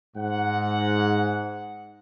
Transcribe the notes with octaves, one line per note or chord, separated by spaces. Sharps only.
G#2 F#5